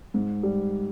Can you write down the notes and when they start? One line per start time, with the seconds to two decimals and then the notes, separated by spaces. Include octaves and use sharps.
0.14 G#2
0.43 G3